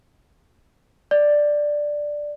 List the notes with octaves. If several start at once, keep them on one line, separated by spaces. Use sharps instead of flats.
D5